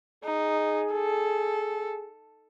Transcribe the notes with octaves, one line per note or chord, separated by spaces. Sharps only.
D#4 G#4
A4